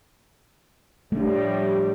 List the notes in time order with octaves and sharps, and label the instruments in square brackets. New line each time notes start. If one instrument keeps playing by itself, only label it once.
[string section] A2 F3 G3 [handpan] A3 D4